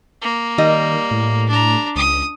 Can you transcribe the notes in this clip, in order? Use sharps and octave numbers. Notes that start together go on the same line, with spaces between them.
A#3
D#3 G3 D#5
A2
D4 A#5
C#2 D#6